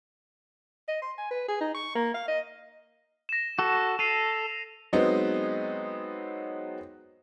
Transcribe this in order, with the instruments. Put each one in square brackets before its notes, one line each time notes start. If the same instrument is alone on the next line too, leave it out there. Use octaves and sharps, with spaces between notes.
[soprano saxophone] D#5
C6
G#5
B4
G#4
D#4
C#6
A#3
F5
D#5
[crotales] A#6 E7
[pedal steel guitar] F#4 A4
[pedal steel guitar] A4 [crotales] C7 D#7 F7
[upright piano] F#3 G#3 B3 C4 D#4